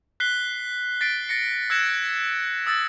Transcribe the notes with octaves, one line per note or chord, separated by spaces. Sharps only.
F#6 B6 C7 G7
A6 B6 C7 D7
A6 A#6 C#7
E6 F#6 G#6 A#6 C#7 E7
D#6 E6 A6